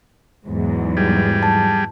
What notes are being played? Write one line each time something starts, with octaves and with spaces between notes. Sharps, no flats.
E2 G#2 F#3
G3 G#4
A5